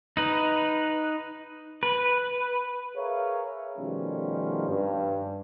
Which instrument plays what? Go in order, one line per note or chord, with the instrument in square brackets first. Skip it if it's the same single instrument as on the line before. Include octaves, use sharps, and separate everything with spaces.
[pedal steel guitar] D#4 B4
B4
[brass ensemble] G#4 A#4 B4 C#5 E5 F5
B2 D#3 F3 G3 A3 C#4
G2